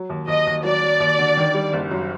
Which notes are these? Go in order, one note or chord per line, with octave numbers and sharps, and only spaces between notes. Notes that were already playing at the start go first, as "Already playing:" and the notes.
Already playing: F#3
D#2
D#2 D#5
D#2
F#3 D5
F#3
D#2
D3
D#3
G3
F#1
F#2